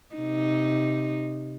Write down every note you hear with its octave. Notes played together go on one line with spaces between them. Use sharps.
C3 D#4